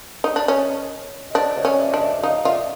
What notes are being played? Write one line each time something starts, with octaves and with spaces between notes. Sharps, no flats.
D#4
D4
C#4 C#5 D#5
D#5
D4 C5 D5
C#5 D#5
C#4
D5 E5
D4 D#5
D5 E5
D#4 D#5 F5
F4 D5 E5